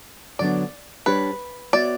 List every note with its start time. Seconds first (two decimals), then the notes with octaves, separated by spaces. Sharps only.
0.39 D3 F#3 B3 D4 D5
1.06 G3 D4 G4 B4 C#5
1.73 B3 F#4 C#5 D5 E5